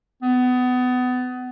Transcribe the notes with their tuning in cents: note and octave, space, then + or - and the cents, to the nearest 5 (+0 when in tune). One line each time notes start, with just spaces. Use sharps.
B3 +25